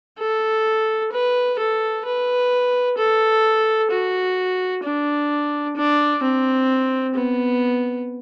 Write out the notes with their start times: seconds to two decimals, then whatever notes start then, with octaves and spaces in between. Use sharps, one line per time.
0.19 A4
1.12 B4
1.58 A4
2.05 B4
2.97 A4
3.90 F#4
4.83 D4
5.76 D4
6.23 C4
7.15 B3